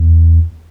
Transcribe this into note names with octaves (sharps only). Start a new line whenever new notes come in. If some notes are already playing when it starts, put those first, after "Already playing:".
Already playing: E2